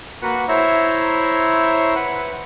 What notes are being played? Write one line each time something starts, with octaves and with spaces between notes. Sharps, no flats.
A#3 F#4 B4 F#5
E4 C5 C#5 E5 A#5
B4 F#5